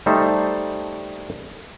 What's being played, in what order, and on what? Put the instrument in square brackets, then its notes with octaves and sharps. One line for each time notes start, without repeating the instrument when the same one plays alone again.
[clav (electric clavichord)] G3 A3 D#4 A4 C5